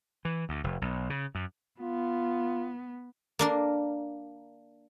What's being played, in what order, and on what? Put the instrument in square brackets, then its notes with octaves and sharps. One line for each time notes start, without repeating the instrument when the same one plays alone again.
[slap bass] E3
D2
F1
B1
C#3
F#2
[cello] B3 [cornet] F4
[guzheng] A#3 D4 A#4